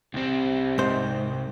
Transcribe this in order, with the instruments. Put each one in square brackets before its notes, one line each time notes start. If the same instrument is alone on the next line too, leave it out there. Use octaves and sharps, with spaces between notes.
[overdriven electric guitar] C2 C4 [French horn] C3
[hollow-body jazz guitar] G#2 C5